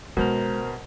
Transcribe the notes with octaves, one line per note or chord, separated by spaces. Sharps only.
B2 D3 G#3 A#4 C5 A#5